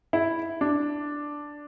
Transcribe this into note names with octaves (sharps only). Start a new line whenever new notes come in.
E4
D4